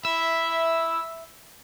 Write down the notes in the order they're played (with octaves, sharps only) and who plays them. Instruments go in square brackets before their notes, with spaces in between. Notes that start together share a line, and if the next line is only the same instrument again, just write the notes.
[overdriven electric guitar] E5 [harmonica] B5 E6